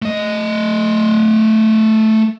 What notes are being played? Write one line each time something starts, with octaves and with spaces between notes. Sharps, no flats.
A3 D#5